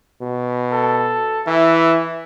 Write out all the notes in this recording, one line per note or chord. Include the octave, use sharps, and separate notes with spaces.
B2
A4
E3 E5